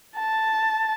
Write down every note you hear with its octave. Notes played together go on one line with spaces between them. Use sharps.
A5